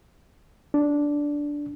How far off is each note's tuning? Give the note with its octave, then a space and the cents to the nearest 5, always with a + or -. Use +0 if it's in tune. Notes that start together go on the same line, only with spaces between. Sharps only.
D4 -10